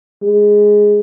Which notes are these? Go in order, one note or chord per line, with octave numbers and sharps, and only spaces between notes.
G#3